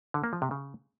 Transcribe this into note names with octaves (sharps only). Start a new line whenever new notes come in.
D3
A#3
F3
C3
C#3